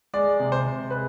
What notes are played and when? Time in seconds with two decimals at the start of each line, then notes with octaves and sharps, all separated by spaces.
0.13 G#3 D5
0.39 C3
0.52 C5
0.65 C3
0.90 G#3 B4